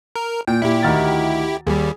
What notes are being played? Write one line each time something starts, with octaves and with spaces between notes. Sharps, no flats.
A#4
A#2 G5
A#2 E4 G4
D2 D#3 A6
D#2 G3 G#4